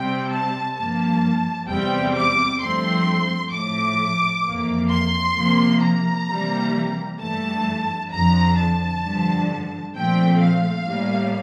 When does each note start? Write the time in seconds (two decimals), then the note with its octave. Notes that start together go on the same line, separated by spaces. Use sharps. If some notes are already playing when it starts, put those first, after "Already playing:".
Already playing: C3 G3 C4 G5
0.31 A5
0.77 G2 F3 A#3 A5
1.69 E2 C3 G3 C4 G5
2.15 D6
2.60 G2 F3 A3 C4 C6
3.52 A2 F3 A3 D6
4.45 F2 E3 A#3
4.90 C6
5.36 C3 F3 A#3
5.82 A#5
6.28 C3 E3 G3 A#3
7.19 G2 E3 A3 A5
8.11 F2 D3 F3 A#5
8.57 A5
9.04 G2 D3 F3
9.95 A#2 F3 A3 C4 G5
10.41 F5
10.87 A2 G3 A#3